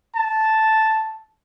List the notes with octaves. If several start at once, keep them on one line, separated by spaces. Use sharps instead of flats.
A5